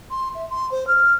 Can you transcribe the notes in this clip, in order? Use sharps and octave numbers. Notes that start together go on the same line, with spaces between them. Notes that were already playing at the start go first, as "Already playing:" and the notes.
C6
E5
C6
C5
F6